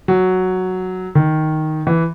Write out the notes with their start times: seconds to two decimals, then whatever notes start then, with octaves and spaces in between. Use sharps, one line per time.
0.08 F#3
1.15 D#3
1.87 E3